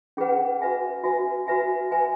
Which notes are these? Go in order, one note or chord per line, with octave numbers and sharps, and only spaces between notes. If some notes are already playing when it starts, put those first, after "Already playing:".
C#4 G#4 B4 F#5
F#4 B4 E5 G#5
F#4 B4 E5 G#5
F#4 B4 E5 G#5
F#4 B4 E5 G#5